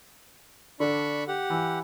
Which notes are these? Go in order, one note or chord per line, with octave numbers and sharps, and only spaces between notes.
D3 D4 B5 C#6
G4 F#5
E3